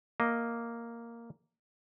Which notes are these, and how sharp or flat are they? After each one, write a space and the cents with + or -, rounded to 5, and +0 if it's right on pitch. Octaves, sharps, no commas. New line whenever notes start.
A#3 +0 D#5 +0